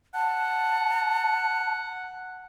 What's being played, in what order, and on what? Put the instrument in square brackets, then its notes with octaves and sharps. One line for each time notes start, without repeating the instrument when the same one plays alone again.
[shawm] F#5 [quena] A5